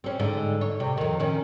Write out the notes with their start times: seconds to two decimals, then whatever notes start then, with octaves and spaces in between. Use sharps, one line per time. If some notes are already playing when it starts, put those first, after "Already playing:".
0.04 C4 C#4
0.20 G#2 D3
0.61 C#5
0.80 C3
0.97 F2 D#3
1.20 D#3 C#4